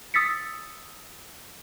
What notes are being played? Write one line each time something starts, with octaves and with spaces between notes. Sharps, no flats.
D#6 E6 A6 B6 C#7